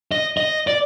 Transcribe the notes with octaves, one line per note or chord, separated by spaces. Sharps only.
D#5
D#5
D5